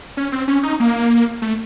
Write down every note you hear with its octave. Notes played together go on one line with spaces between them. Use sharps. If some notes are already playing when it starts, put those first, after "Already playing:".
C#4
C4
C#4
D#4
A#3
A3